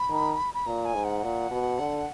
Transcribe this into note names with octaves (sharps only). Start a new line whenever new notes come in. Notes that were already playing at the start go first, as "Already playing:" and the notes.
Already playing: B5
D#3
B5
A#2 A#5
G#5
G#2
F#5
A#2
B2
D3